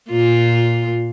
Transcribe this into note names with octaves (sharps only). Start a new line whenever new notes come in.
A#2 F4